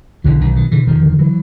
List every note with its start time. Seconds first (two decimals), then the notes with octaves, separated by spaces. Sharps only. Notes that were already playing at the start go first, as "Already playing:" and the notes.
0.24 B1 D3 E3
0.40 B1 D#3
0.56 B2 D#3
0.71 B2 D3 E3
0.87 E1 D#3 F3
1.03 D3
1.19 E3 F#3